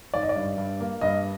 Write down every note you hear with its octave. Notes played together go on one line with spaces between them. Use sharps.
G#1 D5
D#5
D5
G2
G2
A#3
G2 D#5